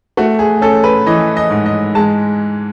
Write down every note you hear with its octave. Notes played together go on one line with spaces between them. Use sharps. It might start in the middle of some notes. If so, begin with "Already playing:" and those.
A3 F#4
G#4
C#4 A4
B4
E3 D#5
D#5
G#2
D#5
G#3 A5